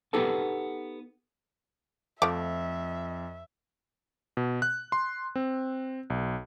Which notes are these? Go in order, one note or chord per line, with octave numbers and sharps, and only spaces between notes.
B3 D#4 G4 A4 A5
F2 F3 A3 E5 D6
B2
F#6
C6
C4
B1